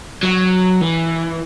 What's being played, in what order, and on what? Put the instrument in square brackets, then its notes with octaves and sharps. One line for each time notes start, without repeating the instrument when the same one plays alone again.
[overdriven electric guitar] F#3
E3